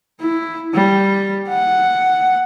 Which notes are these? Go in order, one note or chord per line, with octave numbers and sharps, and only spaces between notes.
E4
G3
F#5